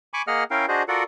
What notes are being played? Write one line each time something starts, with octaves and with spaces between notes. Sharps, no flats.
G#5 B5 C#6 D6
A#3 G#4 D#5 F#5 F6
C#4 E4 A#4 F5 G5
D4 F#4 G#4 C5 D#5
F4 F#4 A4 A#4 D5 F#5